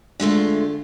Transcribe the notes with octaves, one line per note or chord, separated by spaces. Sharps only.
D3 G#3 A3 F4